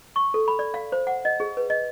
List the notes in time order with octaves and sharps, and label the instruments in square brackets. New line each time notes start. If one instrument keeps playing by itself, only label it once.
[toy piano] C#6
A4
B5
D5
F5
C5
F#5
D#5
G#4
B4
D#5